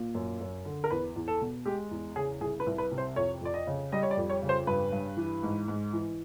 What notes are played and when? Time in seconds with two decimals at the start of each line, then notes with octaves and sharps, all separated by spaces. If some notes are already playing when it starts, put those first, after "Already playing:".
Already playing: A#2
0.15 F#2
0.41 F#2
0.65 D3
0.84 A#4
0.90 E2 B4
1.16 E2
1.28 A4
1.41 B2
1.66 G#3 G4
1.91 E2
2.16 C#3 G#4
2.41 C2 G#4
2.60 B4
2.67 C2
2.78 B4
2.92 C3
2.98 C5
3.16 F2 C#5
3.41 F2 D5
3.54 D#5
3.67 C#3
3.92 G3 D#5
4.03 C#5
4.11 D5
4.17 F2
4.29 C#5
4.43 C#3
4.49 C5
4.67 G2 B4
4.92 G2
5.17 E3
5.43 G#2
5.68 G#2
5.93 E3